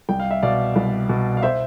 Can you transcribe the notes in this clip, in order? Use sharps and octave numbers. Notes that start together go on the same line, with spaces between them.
C2 G5
F5
E5
B2 D5 F5
C2
B2
F5
C5 E5